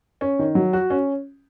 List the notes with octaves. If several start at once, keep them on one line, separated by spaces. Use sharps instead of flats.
C#4
D#3
F#3
F#4
C#4